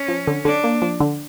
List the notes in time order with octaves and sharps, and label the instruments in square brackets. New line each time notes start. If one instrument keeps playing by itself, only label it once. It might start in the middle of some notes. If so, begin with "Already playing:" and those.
Already playing: [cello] C#4
[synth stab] F3
D3
[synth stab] D3 [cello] D4
[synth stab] A#3
F3
D3